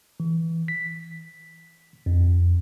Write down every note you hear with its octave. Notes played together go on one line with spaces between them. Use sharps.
E3
B6
F2